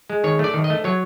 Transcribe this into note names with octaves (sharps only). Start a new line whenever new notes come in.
G#3
D#3 C#5
A3 D5
D#3
D#5
A3
F#3 C#5